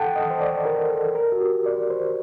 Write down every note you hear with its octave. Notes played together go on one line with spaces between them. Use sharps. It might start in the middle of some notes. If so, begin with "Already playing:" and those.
Already playing: A4 F#5 G5 A5
D#5
C5
D5
A#4
A4
A#4
F#4
G4
D5
C5